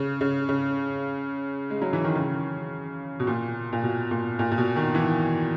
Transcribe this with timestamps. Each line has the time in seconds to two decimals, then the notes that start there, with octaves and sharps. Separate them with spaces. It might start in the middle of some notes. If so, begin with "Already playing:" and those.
Already playing: C#3
0.21 C#3
0.49 C#3
1.70 G#3
1.82 F#3
1.93 E3
2.04 D#3
2.15 C#3
3.20 B2
3.27 A#2
3.73 A#2
3.83 B2
4.11 A#2
4.39 A#2
4.52 A#2
4.58 B2
4.76 D#3
4.95 E3